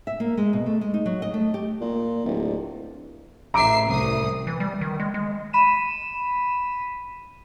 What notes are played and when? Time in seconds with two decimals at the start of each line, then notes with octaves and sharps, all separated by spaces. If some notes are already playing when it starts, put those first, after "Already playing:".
0.07 E5
0.20 A#3
0.37 G#3
0.53 B2
0.66 A3
0.81 G#3
0.94 D#4
1.06 F#3
1.22 D#5
1.34 A3
1.54 G4
1.81 A#2
2.25 D1
3.54 A1 E5 A#5 D6 C7 D7
3.87 C2 D#6
4.47 E3
4.60 G3
4.81 D#3
5.00 G#3
5.14 G#3
5.53 B5 B6 D#7 E7